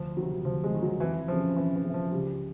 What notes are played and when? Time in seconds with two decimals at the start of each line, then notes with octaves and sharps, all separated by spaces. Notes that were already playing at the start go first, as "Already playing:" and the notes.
Already playing: D2 F3
0.17 C3 D#3 F#3
0.45 D2 F3
0.64 G#3
0.73 C3 D#3
0.82 F#3
1.00 F2 E3
1.28 C#3 E3 F3
1.56 F2 E3
1.75 E3
1.84 C#3
1.89 E3 F3
2.12 C#2 G3